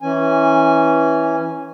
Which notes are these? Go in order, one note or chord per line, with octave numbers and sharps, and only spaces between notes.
E3 C#4 G#5